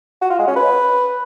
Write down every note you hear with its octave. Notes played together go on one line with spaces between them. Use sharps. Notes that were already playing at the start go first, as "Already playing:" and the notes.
F#4
F4
G#3
C#4
B4